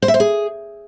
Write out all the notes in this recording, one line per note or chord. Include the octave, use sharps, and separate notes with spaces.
C5
E5
C5
G#4